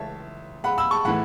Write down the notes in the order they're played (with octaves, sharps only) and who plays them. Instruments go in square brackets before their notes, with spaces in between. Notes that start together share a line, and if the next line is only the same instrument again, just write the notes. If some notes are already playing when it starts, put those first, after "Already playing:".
Already playing: [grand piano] C#2 E3 A3 C#5 E5 A5
F#5 B5
B5 E6
A5 C#6
A2 E3 A3 F#5 B5